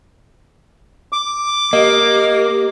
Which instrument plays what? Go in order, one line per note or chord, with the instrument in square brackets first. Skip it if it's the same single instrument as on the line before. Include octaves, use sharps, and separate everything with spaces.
[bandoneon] D6
[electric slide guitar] A#3 [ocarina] G4 [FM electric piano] D#5